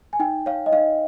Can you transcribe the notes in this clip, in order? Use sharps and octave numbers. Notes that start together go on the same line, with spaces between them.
G#5
D#4 G5
C#5 F5
D#5
D#4 F5